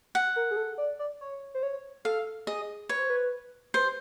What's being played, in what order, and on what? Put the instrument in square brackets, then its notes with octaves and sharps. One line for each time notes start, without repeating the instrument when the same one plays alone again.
[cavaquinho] F#5
[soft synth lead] A#4
G#4
A4
D5
D5
C#5
C5
C#5
[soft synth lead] A4 [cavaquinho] F5
[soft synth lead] G#4 [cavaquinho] D#5
[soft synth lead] B4 [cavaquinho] C#5
[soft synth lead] C5
B4
[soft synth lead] B4 [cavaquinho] C5